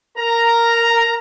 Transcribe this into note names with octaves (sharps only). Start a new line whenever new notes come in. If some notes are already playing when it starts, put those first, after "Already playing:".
A#4 A#5